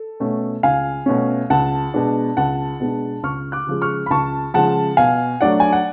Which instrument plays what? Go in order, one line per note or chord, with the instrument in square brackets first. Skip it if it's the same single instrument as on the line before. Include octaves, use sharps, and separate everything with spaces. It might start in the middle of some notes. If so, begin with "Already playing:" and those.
Already playing: [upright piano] A4
B2 A3 C#4
C#2 F5 G#5
B2 A3 C#4
C#2 F#5 A5
B2 G#3 B3 D4
C#2 F#5 A5
B2 G#3 B3 D4
C#2 C#6 F6
D6 F#6
C#3 F3 G#3
C#6 F6
B5
C#2 A5 C#6
C#3 F3 G#3 F#5 A5
B2 F5 G#5
F#3 A3 D4 D5 F#5
G#5
F#5